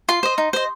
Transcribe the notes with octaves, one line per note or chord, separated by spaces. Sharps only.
F4 C6
C5 D#5
D#4
C5 D#5